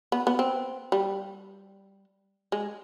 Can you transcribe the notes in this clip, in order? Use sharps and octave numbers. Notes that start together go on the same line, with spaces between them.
B3
B3
C4
G3
G#3